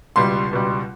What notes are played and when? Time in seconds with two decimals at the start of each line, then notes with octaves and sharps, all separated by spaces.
0.16 C#2 B2 G3 C6
0.51 C#2 B2 G3